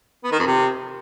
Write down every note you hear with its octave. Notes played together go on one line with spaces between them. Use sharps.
B3
D#3
F2
C3